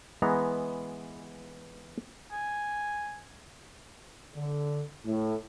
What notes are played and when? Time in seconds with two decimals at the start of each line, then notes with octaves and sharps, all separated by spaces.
0.22 E3 G#3 B3 A#5
2.32 G#5
4.35 D3
5.05 A2